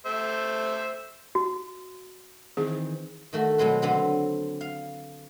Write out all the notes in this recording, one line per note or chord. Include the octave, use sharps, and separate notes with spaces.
A3 C5 E5
F#4
D#3 E3 C4 G#4
D#3 A3 F#4
B2 F#3 G#3 C4 B4
D3 F#3 B3 C4
F5